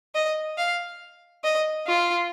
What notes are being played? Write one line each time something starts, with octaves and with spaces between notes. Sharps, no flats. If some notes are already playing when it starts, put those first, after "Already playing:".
D#5
F5
D#5
F4